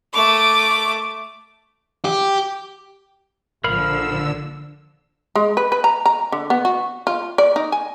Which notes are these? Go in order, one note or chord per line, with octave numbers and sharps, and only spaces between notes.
A3 D6
G4
A#1 D3 F3 A#4 F5 B5 E6 F6
G#3
B4
B4
A#5
A#5
D3
B3
F#4
F4
D5
D#4
G#5